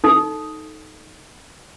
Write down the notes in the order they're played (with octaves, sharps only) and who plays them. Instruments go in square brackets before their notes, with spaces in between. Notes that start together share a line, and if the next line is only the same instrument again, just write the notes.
[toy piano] D#4 A4 D#6